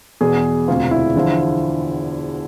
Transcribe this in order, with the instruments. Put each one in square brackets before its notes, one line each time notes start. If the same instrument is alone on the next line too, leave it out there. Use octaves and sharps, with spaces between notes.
[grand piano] E2 B2 G#4
E1 D2 C3 F4
E4
E2 D3 F3